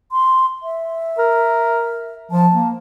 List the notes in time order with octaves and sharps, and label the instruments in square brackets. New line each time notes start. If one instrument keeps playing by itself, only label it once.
[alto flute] C6
E5
[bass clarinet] A#4
[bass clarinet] F3 [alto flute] A5
[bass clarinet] A#3